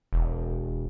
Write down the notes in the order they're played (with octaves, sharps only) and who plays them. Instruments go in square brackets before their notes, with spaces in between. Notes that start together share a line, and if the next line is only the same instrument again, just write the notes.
[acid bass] E1